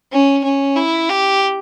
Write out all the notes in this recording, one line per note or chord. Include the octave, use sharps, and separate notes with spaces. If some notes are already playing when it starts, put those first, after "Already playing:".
C#4
C#4
E4
G4